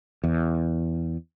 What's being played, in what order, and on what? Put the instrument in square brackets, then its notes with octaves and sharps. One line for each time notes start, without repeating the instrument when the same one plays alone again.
[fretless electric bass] E2